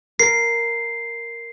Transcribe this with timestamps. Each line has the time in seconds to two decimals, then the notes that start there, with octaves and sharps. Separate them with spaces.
0.19 A#4 C7